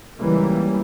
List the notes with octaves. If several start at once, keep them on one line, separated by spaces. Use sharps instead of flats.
C#2 E3 G3 A#3